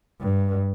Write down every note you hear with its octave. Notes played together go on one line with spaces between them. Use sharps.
G2